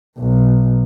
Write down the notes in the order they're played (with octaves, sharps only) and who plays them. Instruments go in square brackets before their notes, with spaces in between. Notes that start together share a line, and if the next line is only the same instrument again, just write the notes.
[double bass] B1